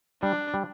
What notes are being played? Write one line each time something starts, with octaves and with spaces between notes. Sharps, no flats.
G3 D4
G3